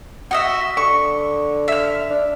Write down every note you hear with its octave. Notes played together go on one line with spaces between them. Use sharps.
F#4 D#5 E5
D3 C#6
E5 F6
D4